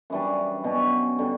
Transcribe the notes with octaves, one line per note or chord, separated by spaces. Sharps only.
F#2 E3 G3 D4
B2 F#3 C#4
D3 G3